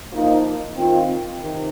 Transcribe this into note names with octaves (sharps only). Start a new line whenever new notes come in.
F3 A#3 D#4
D#3 C4 F4
C3 D#3